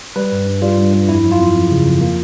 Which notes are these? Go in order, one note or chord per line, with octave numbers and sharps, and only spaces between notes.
G3 B4
G2
G2
G3 F4
G2
G2
F2 E4
F#3
F4
F2
F2
C#3
F2
A#3